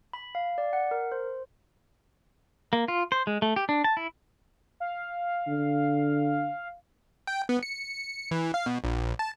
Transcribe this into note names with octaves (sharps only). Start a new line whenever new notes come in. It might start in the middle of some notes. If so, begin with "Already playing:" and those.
B5
F5
D5
F#5
A#4
C5
A#3
F4
C5
G#3
A3
G4
D4
A5
E4
F5
D3
G5
B3
C#7
C#7
E3
F5
B2
A#1
A5